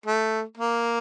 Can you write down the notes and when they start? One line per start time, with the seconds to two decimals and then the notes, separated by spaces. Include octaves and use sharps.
0.06 A3
0.58 A#3